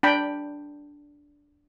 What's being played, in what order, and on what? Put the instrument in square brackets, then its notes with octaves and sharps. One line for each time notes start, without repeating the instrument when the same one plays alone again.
[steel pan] D4 G5 B5